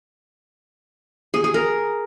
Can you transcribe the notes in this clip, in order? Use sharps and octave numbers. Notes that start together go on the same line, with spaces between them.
G#4
G#4
A#4